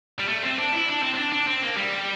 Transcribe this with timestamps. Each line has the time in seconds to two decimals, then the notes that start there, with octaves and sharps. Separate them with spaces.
0.19 G3
0.28 A3
0.43 C4
0.58 D4
0.72 E4
0.88 D4
1.03 C4
1.14 C4
1.18 D4
1.32 D4
1.47 C4
1.63 A#3
1.77 G3